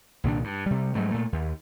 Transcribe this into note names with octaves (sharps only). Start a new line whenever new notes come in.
C2 A#2 D#3 D4
G2
C3 G3
G#2 F#3 G3 A3
A#2 A3
D#2